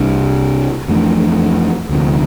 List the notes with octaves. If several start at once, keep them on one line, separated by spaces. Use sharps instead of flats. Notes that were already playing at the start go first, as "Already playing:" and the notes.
Already playing: C2 C3 G3 D4
F2 E3 A3 D4
D2 C3 F3